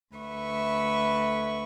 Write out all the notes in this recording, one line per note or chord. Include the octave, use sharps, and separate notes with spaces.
D2 B4 E5 C#6